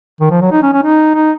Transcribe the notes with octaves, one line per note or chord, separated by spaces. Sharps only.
D#3
F3
F#3
D#4
C#4
C#4
D#4
D#4